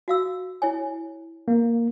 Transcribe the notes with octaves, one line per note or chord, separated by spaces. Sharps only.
F#4 F5 E6
E4 C#5 G#5
A#3